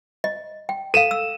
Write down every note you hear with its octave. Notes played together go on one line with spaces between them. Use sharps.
D#5
G5
A4 F5 D#7 E7
E6